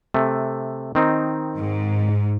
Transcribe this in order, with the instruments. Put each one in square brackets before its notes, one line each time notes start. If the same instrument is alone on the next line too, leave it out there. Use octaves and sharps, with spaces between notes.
[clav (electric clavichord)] C3 A3
D#3 C4 D#4
[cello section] G#2